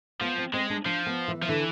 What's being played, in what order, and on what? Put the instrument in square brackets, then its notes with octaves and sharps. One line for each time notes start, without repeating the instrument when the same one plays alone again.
[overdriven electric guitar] F3 [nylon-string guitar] B3
[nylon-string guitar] C4
[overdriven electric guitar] G#3 [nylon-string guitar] C4
[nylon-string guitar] D4
[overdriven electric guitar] F3 [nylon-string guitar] D4
[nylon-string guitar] B3
E3
[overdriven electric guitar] F3
[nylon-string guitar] D3 [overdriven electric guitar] E3